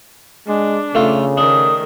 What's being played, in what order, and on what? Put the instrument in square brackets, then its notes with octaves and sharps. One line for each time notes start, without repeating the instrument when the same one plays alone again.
[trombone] G#3 [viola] D4
[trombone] C#3 [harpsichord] A3 F4
[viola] D#3 A3 [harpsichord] D4 [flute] D#6